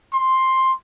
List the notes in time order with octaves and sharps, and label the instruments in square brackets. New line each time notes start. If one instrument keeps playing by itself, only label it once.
[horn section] C6